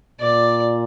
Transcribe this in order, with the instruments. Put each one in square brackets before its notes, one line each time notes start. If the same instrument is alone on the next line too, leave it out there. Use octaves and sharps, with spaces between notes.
[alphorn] A#2 [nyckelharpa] D5